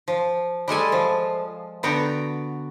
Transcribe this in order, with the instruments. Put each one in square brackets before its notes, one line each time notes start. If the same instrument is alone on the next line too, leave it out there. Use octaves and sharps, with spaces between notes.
[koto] F3
G3 G#3 A4 G#5
F3
D3 B3 F#4 G5 A#5